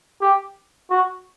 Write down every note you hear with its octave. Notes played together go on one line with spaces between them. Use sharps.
G4
F#4